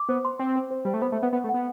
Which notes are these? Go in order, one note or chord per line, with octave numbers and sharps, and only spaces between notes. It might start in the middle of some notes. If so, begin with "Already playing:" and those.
Already playing: D6
B3 C5
C6
C4 C5
C5
C5
G3 C5
A3
B3 C5
A3
B3 E5
B3 F#5
A3
F#5
B3